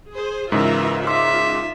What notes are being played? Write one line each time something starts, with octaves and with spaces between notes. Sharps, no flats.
G#4 C5
G#2 C#3 E3 F4 A#4 E5
D#4 F4 E5 C6 D6 E6